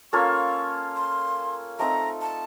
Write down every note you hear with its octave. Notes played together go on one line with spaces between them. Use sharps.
A#3 C#4 F4 A4 C#6
C6
A3 C4 D#4 A4 A#5
A5